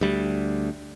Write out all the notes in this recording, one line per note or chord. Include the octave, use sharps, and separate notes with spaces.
D2 G3